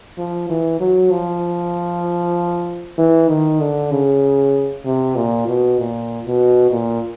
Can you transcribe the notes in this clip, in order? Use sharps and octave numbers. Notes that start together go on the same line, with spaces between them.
F3
E3
F#3
F3
E3
D#3
D3
C#3
C3
A#2
B2
A#2
B2
A#2